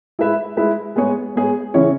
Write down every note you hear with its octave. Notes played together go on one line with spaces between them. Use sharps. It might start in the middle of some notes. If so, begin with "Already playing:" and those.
G#3 E4 B4 E5
G#3 E4 B4 E5
G#3 B3 G#4 C#5
G#3 B3 G#4 C#5
C#3 E3 C#4 E4 C#5